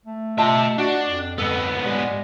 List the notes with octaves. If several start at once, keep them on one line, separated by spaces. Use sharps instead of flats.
A3
F4 G4 D#5 E5 A5
D4 F#4
F2
G#2 B3 A4
G3 G#3